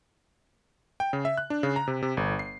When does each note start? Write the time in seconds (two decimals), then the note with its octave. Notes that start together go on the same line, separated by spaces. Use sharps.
1.00 G5
1.13 C#3
1.25 E5
1.38 F#6
1.50 D4
1.63 C#3
1.76 A#5
1.87 C3
2.02 C3
2.17 G1
2.39 C7